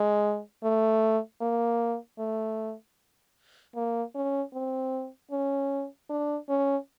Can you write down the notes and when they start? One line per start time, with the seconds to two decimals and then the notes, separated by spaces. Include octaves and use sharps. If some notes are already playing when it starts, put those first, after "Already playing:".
Already playing: G#3
0.64 A3
1.41 A#3
2.19 A3
3.75 A#3
4.15 C#4
4.53 C4
5.31 C#4
6.10 D4
6.49 C#4